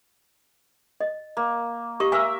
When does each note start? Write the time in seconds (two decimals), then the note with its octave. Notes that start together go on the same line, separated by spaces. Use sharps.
1.01 D#5
1.37 A#3
2.00 G4 D#5 C#6
2.12 A#4 E5 G#5 E6